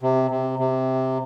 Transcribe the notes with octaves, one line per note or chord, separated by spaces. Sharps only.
C3
C3
C3